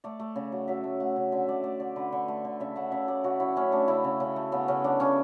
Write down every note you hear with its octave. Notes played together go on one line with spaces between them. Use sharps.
A3 D5
A3
C#3
F#3
F#3 E5
A3
A3 F#5
C#3
D3 E5
A3 D5
A3 D5
D3 D5
D3 B4
D3
A3
D3
C#3 E5
A3 F#5
C#3 E5
A3 D5
C#3 F#4
F#3 E4
A3 C#4
A3 D4
C#3 E4
C#3
C#3
A3
C#3 B3
C#3 C#4
F#3 D4
C#3 C#4